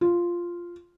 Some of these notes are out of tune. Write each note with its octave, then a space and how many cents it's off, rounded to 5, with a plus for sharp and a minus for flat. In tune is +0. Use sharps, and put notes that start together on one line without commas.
F4 -5